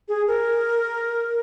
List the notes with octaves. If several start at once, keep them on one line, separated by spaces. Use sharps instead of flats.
G#4
A#4